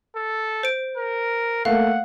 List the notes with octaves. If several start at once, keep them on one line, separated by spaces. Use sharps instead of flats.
A4
C5 D7
A#4
A3 A#3 A4 F5 F#5